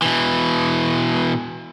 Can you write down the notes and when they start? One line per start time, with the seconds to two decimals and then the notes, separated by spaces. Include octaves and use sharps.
0.02 B2 E3